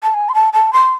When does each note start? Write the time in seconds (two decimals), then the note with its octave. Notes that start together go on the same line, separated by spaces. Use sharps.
0.03 A5
0.14 G#5
0.29 C6
0.34 A5
0.53 A5
0.73 C6